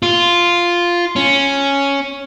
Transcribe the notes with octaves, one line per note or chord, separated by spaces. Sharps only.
F4
C#4